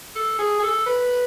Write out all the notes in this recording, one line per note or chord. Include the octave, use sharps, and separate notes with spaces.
A4
G#4
G#4
A4
B4